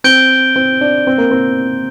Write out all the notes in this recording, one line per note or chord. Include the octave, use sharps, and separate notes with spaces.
C4 G6 D7 G7
C4
D4
C4
A#3
C4